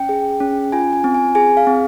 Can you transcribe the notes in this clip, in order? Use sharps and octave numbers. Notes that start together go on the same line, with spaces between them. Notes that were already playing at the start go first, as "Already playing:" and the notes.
Already playing: C#4 G5
G#4
C#4
F4 G#5
G#5
C4
G#5
G#4 G#5
F5
C4